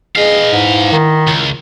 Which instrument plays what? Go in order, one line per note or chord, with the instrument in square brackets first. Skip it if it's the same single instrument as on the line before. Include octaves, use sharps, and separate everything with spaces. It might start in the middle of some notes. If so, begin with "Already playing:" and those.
[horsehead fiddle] G#4 D#5 [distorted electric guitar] B4 F5
[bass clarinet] G#2 [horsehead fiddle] E4
[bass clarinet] D#3
[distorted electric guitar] C#2